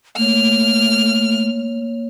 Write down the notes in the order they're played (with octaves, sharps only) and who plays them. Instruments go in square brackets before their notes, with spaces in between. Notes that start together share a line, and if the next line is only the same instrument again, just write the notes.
[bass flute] A3 [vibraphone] A#3 C#5 [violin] F6